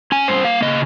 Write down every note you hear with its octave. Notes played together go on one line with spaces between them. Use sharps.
C#4 G#5
G3 C5
A#3 F5
C#3 D#5